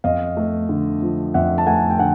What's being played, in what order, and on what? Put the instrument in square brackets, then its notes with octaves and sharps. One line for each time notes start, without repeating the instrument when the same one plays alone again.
[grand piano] F2 D#5 F5
A3
D3
F3
F2 E5 F#5
A5
A3 F#5 G#5
G5
D3 F#5 G#5